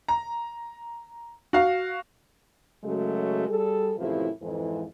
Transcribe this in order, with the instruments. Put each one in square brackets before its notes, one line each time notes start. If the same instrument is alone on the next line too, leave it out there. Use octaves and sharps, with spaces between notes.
[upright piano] A#5
F#4 F5
[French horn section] F#2 C#3 F#3 G#3 A3 F#4
G3 G#4 A4
F#2 A2 C3 E3 F3 E4
F2 G#2 E3